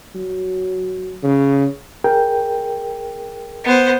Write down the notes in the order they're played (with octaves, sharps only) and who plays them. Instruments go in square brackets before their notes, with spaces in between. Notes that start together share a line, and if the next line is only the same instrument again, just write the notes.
[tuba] F#3
C#3
[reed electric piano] G#4 A#4 G5
[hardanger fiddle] B3 C5